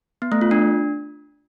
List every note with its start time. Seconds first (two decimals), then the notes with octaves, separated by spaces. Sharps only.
0.22 B3
0.32 A3
0.41 F4
0.51 D4